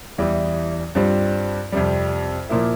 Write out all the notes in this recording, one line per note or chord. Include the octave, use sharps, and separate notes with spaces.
E2 E3 G3
G2 G3 C4 F4
F2 C3 G3
A#2 F3 A#3 E4